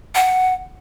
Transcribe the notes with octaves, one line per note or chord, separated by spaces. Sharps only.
F#5